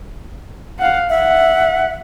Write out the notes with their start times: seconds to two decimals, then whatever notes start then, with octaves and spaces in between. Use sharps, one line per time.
0.79 F5 F#5
1.10 E5 F#5